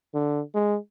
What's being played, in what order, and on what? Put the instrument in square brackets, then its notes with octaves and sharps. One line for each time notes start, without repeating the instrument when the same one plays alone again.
[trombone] D3
G#3